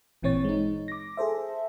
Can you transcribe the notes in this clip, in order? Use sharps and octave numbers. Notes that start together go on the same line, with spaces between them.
G#1 A#2 E3 C4 C#5 A6
G#3 D#4
D6 A#6
G#4 A4 C5 E5